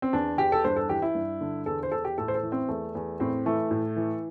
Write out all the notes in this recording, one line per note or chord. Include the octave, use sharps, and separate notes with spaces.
C4
E2 D4
E2 G4
A4
G2 C5
A4
E3 G4
E4
G2
D3
E2 A4
C5
E2 A4
G4
A2 A4
C5
A4
E3
C4
E2 A3
E2
A2 C4
E3 A3
A2
E3